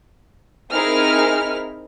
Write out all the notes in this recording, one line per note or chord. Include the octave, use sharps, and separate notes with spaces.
C4 D#4 E4 G#4 A#4 F6